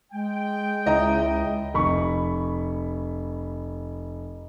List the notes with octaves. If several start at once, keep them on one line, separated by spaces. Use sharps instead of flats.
G#3 G5
C#2 E4 D#5 A#5
F1 B5 C#6